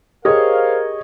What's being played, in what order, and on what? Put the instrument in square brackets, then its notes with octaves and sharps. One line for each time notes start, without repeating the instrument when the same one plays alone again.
[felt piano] G4 G#4 [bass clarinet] A#4 [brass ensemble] C5 F5 [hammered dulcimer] C#5 D#5